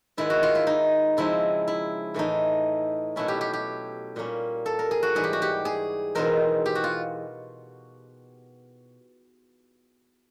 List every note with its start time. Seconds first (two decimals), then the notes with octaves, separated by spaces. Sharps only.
0.17 G#2 D#3 G#3 B3 E4
0.30 F#4
0.43 F4
0.55 E4
0.67 D#4
1.17 C#3 F3 G#3 C4 D#4 E4
1.68 E4
2.14 A2 E3 A3 D#4
3.16 B2 F#3 A3 C#4 E4
3.28 G4
3.41 G4
3.53 G4
4.16 A#2 G3 A#3 C#4
4.66 A4
4.79 A#4
4.91 G#4
5.03 F#4
5.15 G#2 E3 G3 G#4
5.24 G4
5.33 F#4
5.42 G4
5.65 G#4
6.15 E2 B2 G#3 C4 D#4 A#4
6.66 G4
6.75 F#4
6.84 F4